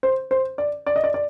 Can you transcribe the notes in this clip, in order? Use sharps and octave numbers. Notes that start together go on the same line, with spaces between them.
C5
C5
D5
D5
D#5
D5
D5